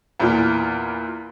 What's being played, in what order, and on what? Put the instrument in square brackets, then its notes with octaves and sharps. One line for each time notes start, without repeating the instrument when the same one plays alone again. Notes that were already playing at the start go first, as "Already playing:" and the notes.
[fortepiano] E2 A#2